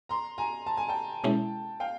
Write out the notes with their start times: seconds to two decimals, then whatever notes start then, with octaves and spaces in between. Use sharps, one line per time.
0.09 A#5 C6
0.38 G#5 A#5
0.67 A5
0.77 G#5
0.88 G5 A5
1.24 B2 G#3 C#4 E4
1.80 F5 G5